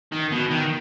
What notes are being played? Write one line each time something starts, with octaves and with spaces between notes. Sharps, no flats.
D#3
B2
D#3